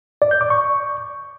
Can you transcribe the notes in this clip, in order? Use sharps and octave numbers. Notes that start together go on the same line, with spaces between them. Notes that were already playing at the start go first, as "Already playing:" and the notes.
D5
G6
D6
C#6